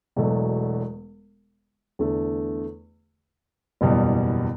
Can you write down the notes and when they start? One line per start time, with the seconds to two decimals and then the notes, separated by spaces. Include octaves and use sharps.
0.16 E1 E2 B2 F#3 A3
1.99 E2 D3 A3
3.81 F#1 E2 B2 G3